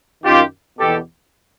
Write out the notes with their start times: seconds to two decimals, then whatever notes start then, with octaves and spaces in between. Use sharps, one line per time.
0.24 F#2 D#3 F4 G4
0.78 E2 B2 G4 A4